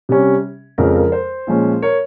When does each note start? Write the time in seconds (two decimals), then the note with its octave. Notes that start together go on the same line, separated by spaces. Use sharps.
0.09 C3 G3 C#4
0.78 F2 C#3 F3 G#3 A#4
0.96 A#4
1.12 C5
1.47 A#2 F3 G#3 C#4
1.82 A#4 C#5